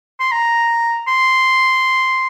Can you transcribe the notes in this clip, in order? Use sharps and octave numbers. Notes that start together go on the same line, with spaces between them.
C6
A#5
C6